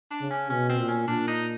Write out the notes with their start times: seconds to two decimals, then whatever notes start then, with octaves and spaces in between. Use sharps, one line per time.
0.11 D4
0.21 C#3
0.30 C#4
0.50 B2 C#4
0.69 C4
0.79 A#2
0.88 C#4
1.08 A#2 D4
1.27 D#4